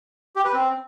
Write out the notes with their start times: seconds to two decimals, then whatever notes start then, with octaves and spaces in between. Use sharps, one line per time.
0.36 G4
0.45 B4
0.53 C4